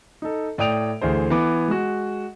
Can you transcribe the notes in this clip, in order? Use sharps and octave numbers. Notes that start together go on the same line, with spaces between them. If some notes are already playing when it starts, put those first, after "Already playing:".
D#4 A4
A2 D5 G5 D#6 D7 F7
D2 E3 G#4 C5
E3 B3 D6
G#3 F#4